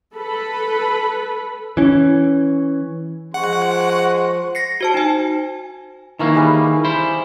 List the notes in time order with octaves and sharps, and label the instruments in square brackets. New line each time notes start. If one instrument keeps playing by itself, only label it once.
[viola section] A4 B4 B5
[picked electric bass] E3 C#4
[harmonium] F3 [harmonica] G#3 [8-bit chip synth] F#5 [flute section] C6 C#6
[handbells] A#6 C7 C#7
F#4 C5 A5
D#4 G#5
[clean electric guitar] D#3 E3 A#3 [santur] E5 F5 C#6
[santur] G3 G#4 B4
[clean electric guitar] E4 C5